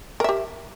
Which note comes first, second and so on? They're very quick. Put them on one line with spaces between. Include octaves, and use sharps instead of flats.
A#4 E5 G4